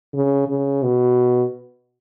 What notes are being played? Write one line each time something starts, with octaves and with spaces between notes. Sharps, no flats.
C#3
C#3
B2